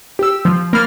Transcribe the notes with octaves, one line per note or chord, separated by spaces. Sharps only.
G4 E6
F3
A#3 B5 F6 A6